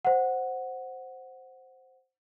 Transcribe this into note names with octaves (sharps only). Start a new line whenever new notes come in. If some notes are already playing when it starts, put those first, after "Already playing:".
C5 F#5